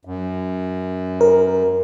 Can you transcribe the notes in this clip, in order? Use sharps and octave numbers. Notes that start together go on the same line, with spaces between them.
F#2
A#4